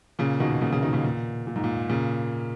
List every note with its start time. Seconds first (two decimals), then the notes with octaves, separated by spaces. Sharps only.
0.19 A#2 C#3
0.40 B2 D#3
0.61 A#2 C#3
0.72 A#2 C#3
0.83 B2 D#3
0.93 A#2 C#3
1.04 A#2
1.47 A#2
1.56 G#2
1.64 A#2
1.89 A#2 C#3